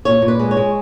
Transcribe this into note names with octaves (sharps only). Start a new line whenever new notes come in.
A#2 C#5
A#2
B4
G#3
C#5
G#3